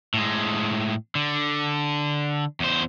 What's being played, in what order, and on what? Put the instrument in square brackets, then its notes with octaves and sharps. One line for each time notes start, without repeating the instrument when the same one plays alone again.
[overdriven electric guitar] A2 G#3
D3
E2 C5